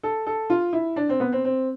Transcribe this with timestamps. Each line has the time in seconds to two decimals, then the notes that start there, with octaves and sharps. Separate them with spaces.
0.03 A4
0.27 A4
0.50 F4
0.73 E4
0.96 D4
1.09 C4
1.20 B3
1.32 C4
1.45 C4